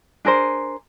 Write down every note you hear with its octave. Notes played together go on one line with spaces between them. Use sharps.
D4 G#4 A#4 C5